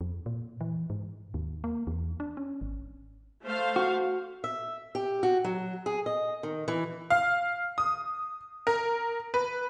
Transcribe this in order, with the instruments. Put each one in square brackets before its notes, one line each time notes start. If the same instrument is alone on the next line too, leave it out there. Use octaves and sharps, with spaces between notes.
[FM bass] F2
A#2
E3
G#2
D#2
A#3
E2
D4
C#4
G#1
[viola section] A3 C5 F5
[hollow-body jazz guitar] F#4
[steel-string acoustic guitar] E5
G4
F#4
F#3
G#4
D#5
D#3
E3
[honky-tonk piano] F5
D#6
A#4
B4